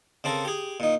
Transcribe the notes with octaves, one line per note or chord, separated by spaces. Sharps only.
C#3 C4 A4 A#4
G4 G#4
A#2 D#4